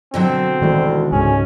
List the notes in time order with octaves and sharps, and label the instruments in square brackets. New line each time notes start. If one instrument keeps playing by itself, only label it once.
[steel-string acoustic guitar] B2 D3 F#3 [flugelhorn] C4
[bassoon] D2 [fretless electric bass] D#3 E3 G#3
[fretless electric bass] C#2 G#2 [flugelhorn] C#4 [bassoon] G#4